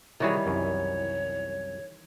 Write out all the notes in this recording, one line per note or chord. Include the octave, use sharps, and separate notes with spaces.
C3 D#3 E3 G3 F#4 G#4 C#5
C2 F#2